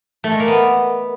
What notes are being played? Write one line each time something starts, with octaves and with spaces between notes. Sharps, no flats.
A3
G#3
A#3
B3